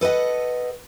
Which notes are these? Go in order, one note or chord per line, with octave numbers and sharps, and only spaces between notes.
A4 B4 C5 D#5 F#5